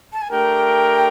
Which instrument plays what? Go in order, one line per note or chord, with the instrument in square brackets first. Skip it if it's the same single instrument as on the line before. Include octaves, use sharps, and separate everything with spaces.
[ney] A5
G#5
[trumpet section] A3 D4 G4 A#4 [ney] G5